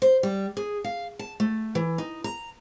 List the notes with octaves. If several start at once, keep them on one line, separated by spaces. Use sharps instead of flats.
C5
G3
G#4
F5
A5
A3
E3
D#4
A#5